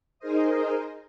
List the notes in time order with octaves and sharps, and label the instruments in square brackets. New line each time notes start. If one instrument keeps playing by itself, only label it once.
[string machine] D#4 G#4 A#4 C5 D#5